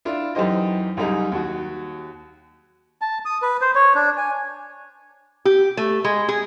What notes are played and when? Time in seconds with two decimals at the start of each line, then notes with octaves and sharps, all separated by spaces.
0.05 D4 E4 F4
0.35 F#2 E3 D#4 G4 C5 D#5
0.97 C2 F#2 G3 D#4 G#4
1.32 D#2 F#4
3.02 A5
3.25 D#6
3.42 B4
3.61 C5
3.75 C#5
3.95 D4
4.17 G#5
5.45 G4
5.77 A3
6.05 G#3
6.29 G#4